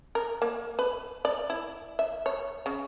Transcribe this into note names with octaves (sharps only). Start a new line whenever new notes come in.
A#4
A#3
B4
D5
E4
E5
C#5
C#3